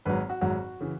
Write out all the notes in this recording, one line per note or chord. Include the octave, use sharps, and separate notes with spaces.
G#1 G#2 F#3 B4
F#4
G#1 G#2 F#3 F#4
C#3 E3